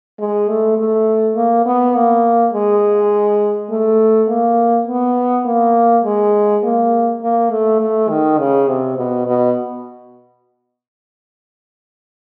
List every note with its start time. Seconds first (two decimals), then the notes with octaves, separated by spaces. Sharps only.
0.19 G#3
0.48 A3
0.78 A3
1.36 A#3
1.66 B3
1.95 A#3
2.53 G#3
3.70 A3
4.29 A#3
4.87 B3
5.45 A#3
6.04 G#3
6.63 A#3
7.21 A#3
7.50 A3
7.80 A3
8.09 D#3
8.38 C#3
8.68 C3
8.97 B2
9.26 B2